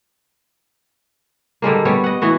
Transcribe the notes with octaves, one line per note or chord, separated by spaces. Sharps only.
D3 G3 G#3 A#3
G3 B3 C#5
D#5 F#5
E3 B3 F#4